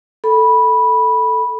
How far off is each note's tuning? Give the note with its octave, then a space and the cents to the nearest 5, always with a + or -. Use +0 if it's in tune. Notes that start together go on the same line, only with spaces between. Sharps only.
A4 +0 B5 -10